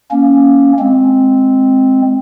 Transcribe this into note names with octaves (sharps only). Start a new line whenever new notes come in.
A#3 C#4
G#3 C4